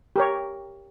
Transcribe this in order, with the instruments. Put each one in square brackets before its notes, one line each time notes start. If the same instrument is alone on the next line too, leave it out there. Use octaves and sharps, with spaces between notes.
[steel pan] G4 A#4 C#5